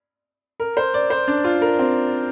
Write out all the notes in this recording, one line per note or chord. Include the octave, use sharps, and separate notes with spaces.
A#4
C5
D5
C5
D4
F4
A#4
C4